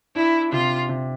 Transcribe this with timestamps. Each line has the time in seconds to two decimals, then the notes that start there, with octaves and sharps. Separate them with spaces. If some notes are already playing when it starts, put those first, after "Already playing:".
0.16 D4 E4
0.52 C3 F4
0.89 C3